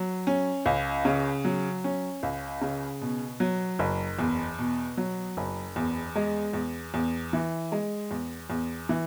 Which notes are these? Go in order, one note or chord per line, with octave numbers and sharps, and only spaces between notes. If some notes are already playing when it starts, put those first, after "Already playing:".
Already playing: F#3
C#4
C#2
C#3
F#3
C#4
C#2
C#3
B2
F#3
F#1
E2
B2
F#3
F#1
E2
G#3
E2
E2
E3
G#3
E2
E2
E3